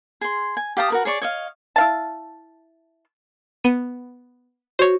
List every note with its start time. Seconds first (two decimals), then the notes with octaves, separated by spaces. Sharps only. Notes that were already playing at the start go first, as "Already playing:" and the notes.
0.21 G#4 C6
0.57 G#5
0.77 G4 F5 A5 D#6
0.90 F#4 A#4 B4
1.05 G#4 C#5 D5 C#6
1.22 C#5 D#5 F5
1.76 E4 F5 A5
3.64 B3 D#7
4.79 F#4 C5 C#5